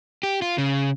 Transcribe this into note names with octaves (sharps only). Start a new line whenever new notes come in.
G4
F4
C#3